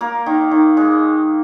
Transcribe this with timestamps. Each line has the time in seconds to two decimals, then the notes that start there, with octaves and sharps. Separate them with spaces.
0.01 A#3 A#4
0.26 D#3
0.51 D#3
0.77 G#3